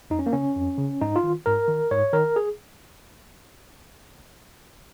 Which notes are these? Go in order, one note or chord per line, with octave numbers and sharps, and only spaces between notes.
F2 D#4
C#4
A#3
C#3 C#4
F2
C#3
G#2 D#4
F4
D#3
G#2 A#4
D#3
G#2 C#5
D#3 A#4
G#4